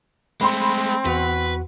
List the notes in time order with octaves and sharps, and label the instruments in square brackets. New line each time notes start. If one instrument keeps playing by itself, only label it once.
[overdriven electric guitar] G#3 A3 [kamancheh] C4 [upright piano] B5 C6
[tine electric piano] E2 F#4 F#5 [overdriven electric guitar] B4